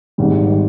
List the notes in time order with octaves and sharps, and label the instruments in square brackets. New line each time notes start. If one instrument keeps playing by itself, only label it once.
[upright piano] G#1 G#2 D#3 G3